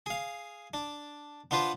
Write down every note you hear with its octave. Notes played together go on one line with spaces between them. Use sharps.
G#4 F5
D4
B3 D4 F4 B4 C5